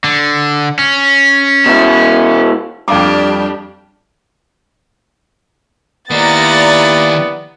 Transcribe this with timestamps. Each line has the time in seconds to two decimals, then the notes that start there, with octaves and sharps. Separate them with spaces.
0.04 D3
0.79 C#4
1.66 B2 E4
2.88 F2 G3 D4 G4 F5 D6
6.11 D#3 A#3 B3 E4 G4 D5 A#5 A6